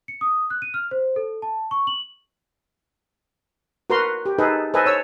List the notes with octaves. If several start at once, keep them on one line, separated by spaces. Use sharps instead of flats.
C#7
D#6
F#6
D#7
F6
C5
A4
A5
C#6
F#7
F#4 A#4 B4 A#5 C6
G4
D#4 G#4 A4 B4 D#5
A4 B4 C5 D#5 G#5
C#5 E6